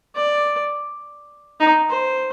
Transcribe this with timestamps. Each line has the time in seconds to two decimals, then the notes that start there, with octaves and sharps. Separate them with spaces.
0.16 D5
1.60 D#4
1.89 C5